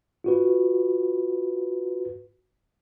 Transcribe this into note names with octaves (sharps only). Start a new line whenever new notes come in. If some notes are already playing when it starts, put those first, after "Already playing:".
F4 F#4 B4